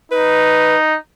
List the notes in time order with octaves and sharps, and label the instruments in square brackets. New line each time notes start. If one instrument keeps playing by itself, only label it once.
[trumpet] D#4 [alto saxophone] B4